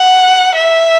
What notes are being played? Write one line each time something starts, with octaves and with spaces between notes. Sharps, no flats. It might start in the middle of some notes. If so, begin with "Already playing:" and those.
Already playing: F#5
E5